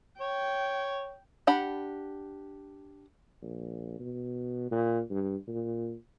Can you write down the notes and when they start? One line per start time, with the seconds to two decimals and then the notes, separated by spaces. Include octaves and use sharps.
0.21 C#5 G5
1.47 D4 G4 F#5 B5
3.42 A#1
4.00 B2
4.71 A#2
5.10 G2
5.47 A#2